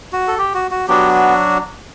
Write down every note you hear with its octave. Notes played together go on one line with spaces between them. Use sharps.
F#4
A4
G4
F#4
F#4
F#3 B3 D4 F#4 G4